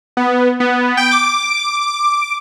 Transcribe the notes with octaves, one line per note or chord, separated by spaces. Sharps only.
B3
B3
G5
D6